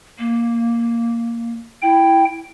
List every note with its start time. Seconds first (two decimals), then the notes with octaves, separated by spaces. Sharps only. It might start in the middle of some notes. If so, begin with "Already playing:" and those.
0.19 A#3
1.82 E4 G5